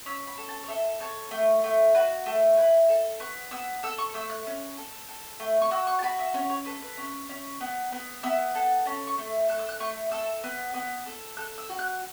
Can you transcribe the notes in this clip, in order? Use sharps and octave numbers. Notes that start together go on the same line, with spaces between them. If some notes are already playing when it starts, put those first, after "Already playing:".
C#4 E6
B5
A4
A5
C#5
A4 E5
A4 C#5
A3
A3
F#4 B4
A3 A4
E4 B4
A4
B3 C#6
B3 E6
A4 E6
C#6
A3 E6
F#6
C#4
A4
A4
A3
C#6
F#4 E6
C#6
A5
F#4 B5
E5
C#4 C#5
C#5
A4 B4
B4
C#4
C#4
B3
B3
B3 E5
A4 F#5
C#4 A5
C#6
A3
A4 F#6
E6
F#6
A3 C#6
A4 E6
B3
B3
A4
A4 F#6
E6
F#4
F#6